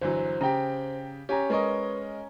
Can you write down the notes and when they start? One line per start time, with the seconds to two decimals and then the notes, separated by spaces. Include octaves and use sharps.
0.01 G1 E3 F#3 C5
0.41 C#3 G4 G5 A#5
1.29 C#4 G4 G#5 A#5
1.50 G#3 A#4 B4 D#5 C#6